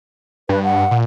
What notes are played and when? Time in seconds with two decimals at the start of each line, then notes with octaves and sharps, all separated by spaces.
0.49 G2 B4
0.63 F#5
0.91 A#2